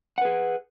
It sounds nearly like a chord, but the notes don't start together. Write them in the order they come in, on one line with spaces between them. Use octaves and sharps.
F#5 B4 G#4